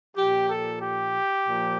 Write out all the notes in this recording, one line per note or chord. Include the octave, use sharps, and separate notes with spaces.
A#2 F3 G4
A4
G4
A#2 F3